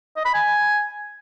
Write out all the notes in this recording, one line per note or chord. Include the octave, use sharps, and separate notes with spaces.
D#5
B5
G#5